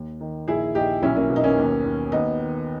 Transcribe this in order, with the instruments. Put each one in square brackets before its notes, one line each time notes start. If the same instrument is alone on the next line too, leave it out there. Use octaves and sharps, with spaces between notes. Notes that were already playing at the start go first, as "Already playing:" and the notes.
Already playing: [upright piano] D#2
D#3
A#1 E4 G#4
A#1 D#4 G4
B1 C#4 E4
A#3 C#4
B2
D#4
A#3 C#4
D#2
D#2
D#2 B3 D#4
D#3